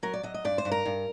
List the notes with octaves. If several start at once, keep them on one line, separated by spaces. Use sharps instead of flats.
F#3 A#4
D5
F#3 D#5
D#5
G2 D5
C5
G2
A#4
G2